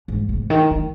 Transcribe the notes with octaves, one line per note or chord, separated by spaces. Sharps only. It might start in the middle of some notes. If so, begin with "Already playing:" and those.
G#2
C3
D#3
D#3